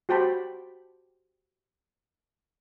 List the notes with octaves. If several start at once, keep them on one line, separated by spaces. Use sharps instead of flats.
F#4 G4 C5 G5 A5 B5